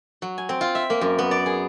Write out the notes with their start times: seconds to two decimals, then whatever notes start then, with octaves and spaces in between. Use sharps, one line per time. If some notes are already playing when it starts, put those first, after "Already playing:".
0.22 F#3
0.38 G#5
0.49 C4
0.61 F4
0.75 E5
0.90 A#3
1.01 F#2
1.19 B3
1.31 D5
1.46 G#4